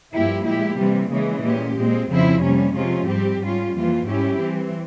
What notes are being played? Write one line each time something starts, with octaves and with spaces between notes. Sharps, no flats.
G2 F3 A#3 E4 G4
A#2 G#3 E4 G4
C3 E3 G3 A#3
C#3 E3 G#3
A#2 G#3 C#4 G4
A#2 G#3 C4
F2 C#3 F3 C4 E4
C3 G3 A#3 C#4
C3 F3 G#3 C#4 F4
G#2 G3 C4 G4
G#2 G3 C#4 F4
F2 E3 G3 A#3 F4
G#2 G3 C#4 E4 G4
E3 G3 C4